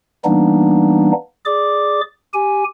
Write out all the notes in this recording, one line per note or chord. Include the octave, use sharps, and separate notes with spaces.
E3 G3 A#3 B3 D4 D#4
G#4 D5 D6
G4 G#5